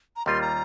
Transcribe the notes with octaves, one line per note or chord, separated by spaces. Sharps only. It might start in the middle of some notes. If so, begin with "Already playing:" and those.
A#5
D#2 D#3 G3 A#3 F4 C6
A#5